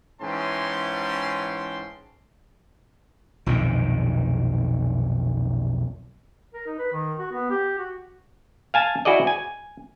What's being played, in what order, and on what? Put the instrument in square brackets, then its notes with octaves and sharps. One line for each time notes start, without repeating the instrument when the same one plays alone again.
[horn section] G#2 E3 C#4 G5 A5 C6
[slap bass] B1 F2 A#2 D#3
[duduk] A#4
D#4
B4
D#3
F#4
B3
G4
F#4
[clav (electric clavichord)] F5 G#5 A5
E4 F#4 G#4 D5 D#5
G#5